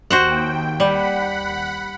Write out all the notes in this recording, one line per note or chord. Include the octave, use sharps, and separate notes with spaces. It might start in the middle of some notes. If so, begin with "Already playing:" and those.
D#2 F#4 C5 F#5 G5
G3 F#5 B5